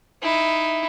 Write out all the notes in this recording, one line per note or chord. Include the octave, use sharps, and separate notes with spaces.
D#4 E4